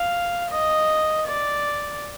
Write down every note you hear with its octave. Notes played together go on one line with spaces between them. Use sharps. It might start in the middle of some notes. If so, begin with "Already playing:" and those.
Already playing: F5
D#5
D5